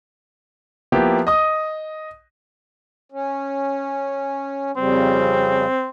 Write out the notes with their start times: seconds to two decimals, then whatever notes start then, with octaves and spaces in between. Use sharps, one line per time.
0.92 F3 A#3 B3 E4 G4
1.27 D#5 D#6
3.12 C#4
4.77 F2 C#3 G3 C4